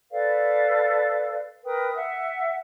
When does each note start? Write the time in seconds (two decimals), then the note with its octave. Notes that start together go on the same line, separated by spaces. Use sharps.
0.11 A4 B4 D5 F5
1.64 A#4 B4 G5 D#6
1.95 E5 F#5